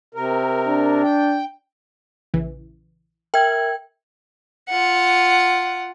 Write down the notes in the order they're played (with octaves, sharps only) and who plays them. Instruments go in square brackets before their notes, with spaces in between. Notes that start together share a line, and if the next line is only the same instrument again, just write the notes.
[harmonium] C3 A#4
[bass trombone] D4
[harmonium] G5
[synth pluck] A#1 C#3 E3
[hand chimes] A#4 E5 G#6 [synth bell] G5
[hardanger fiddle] F4 F#5